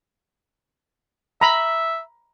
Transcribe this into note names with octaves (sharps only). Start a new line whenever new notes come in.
E5 A#5 B5